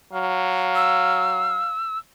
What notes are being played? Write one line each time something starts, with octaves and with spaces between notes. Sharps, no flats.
F#3 F5
E6